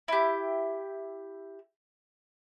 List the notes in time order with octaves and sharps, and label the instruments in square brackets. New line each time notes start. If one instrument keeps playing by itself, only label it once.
[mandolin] E4 G4